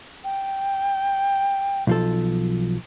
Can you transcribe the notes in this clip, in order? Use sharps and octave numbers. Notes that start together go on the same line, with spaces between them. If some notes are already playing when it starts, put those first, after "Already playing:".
G5
B1 F3 A4